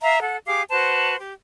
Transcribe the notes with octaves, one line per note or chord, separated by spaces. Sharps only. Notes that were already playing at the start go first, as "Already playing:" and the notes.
E5 F5 A#5
A4 F#5
G4 G#4 F5 D6
F#4 B4 C5 A5
G4